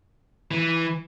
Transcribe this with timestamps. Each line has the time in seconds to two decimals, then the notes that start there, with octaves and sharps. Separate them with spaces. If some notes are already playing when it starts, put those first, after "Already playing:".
0.51 E3